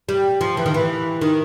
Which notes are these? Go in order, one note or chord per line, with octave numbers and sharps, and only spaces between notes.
G3
F3
E3
D#3
E3
D#3